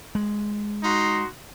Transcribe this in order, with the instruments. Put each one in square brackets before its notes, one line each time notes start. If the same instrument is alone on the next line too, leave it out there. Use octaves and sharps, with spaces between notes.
[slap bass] G#3
[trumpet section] D#4 F#4 C6